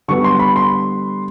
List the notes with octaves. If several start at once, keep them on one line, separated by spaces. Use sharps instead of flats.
D3 G3 B3 C#6
C6
B5
C6